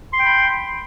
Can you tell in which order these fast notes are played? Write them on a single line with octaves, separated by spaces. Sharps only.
C6 G5 B5